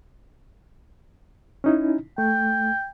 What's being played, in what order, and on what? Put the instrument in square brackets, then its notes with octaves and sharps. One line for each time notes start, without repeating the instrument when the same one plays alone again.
[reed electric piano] C#4 D#4 E4
[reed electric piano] A3 [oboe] G5